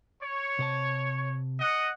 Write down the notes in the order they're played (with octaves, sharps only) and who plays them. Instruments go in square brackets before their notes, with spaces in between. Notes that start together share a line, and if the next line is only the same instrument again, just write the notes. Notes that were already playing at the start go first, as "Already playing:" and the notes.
[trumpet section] C#5
[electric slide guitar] C3 C5 A5
[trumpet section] D#5 F#5